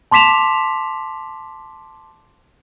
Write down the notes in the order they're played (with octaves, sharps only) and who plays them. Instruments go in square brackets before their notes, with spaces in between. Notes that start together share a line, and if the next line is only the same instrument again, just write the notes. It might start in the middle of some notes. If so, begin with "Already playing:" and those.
[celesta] A5 C6 D6 B6 E7 F7